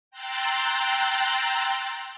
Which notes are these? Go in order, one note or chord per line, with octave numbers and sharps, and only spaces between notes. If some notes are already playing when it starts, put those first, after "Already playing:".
G5 A#5 C6 E6 F#6 A6